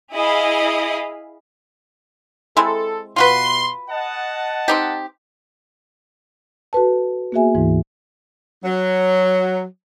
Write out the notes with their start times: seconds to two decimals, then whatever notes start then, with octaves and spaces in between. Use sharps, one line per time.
0.14 E4 G#4 D#5 F5 B5
2.57 G#3 C4 E4 A4
3.16 B2 F4 F#4 B4 C6
3.89 D#5 F#5 A5
4.68 C4 D#4 G4
6.73 F#4 A4 B4 A5
7.32 A#3 B3 F#4 G#4 E5 G#5
7.55 D2 G#2 E3 E4
8.65 F#3